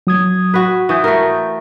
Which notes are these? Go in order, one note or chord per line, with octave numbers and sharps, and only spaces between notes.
F#3 D#6 G#6
F#4 B4
E3 C#6 D#6 G6
A3 A#4